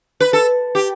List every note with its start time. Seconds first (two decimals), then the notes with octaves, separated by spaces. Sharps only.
0.20 B4
0.33 A4
0.75 G4